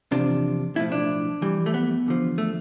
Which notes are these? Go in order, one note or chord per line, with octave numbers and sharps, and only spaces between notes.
E2 C3 F3 D4
B1 A2 F3 E4
D4
F2 E3 G3
A3
B3
E2 D3 F3
A3